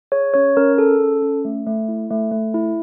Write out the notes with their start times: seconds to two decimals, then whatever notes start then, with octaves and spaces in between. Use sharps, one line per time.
0.12 G#4 C#5
0.34 C#4 C#5
0.57 C#4 A#4
0.78 G#4 A4
1.00 C#4
1.22 C#4
1.45 A3
1.66 A3
1.89 E4
2.11 A3
2.32 A3
2.54 E4